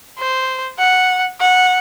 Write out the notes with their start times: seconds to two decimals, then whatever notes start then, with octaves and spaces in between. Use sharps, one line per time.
0.19 C5
0.79 F#5
1.40 F#5